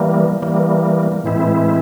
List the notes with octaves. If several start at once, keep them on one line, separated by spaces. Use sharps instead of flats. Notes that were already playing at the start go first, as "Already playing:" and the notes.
Already playing: E3 G3 A#3
E3 G3 A#3
A2 E3 G#3 C4 E4